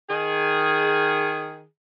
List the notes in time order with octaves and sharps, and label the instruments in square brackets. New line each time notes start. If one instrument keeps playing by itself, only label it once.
[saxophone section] D#3 G#4